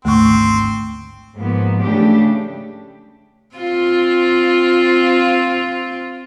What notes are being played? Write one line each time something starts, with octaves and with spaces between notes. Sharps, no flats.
G#1 D2 A3 C4 C#6
G#2 F3 A#3 B3
C#3 E3 A3 D4 G4
C4 F4